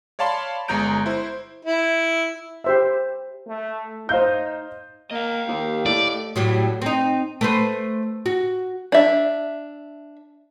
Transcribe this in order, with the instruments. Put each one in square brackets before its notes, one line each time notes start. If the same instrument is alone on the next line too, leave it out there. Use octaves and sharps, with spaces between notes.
[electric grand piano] C#5 D5 F5 A5 B5 C6
G1 G#3 G#4 A#5 G6 D7
E4 C5
[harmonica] E4
[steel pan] G4 C5 E5
[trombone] A3
[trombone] D#4 [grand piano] C5 F5 G6
[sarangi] A#3 [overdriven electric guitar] D#5 F5
[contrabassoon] D#2 [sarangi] G4
[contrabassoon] A2 [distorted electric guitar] D5
[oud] A2 F#3 G3
C4 D#4
A3 B4 C5
F#4
[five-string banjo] D4 E5